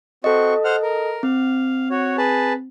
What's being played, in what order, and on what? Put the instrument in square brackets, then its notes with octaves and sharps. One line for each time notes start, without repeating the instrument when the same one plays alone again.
[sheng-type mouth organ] C4 F#4 C#6 [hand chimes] A4 D#5
[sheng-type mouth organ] C5 F#5 F6
A#4
[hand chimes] C4 [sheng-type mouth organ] F5
[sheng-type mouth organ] F#4 C#5
G#4 B4 A5